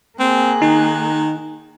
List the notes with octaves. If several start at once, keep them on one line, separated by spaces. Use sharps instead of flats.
A#3 C4 G#4 F#6
D#3 D#4